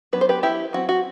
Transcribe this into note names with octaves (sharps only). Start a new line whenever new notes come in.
F#3 B3 D4 B4
C5
G4 B4
E4 G4
F#3 C4 F#4
F#4